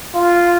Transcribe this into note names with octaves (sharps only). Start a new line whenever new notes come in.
F4